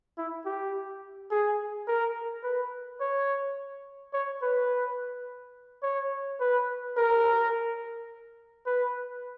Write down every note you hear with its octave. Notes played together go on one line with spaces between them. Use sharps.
E4
G4
G#4
A#4
B4
C#5
C#5
B4
C#5
B4
A#4
B4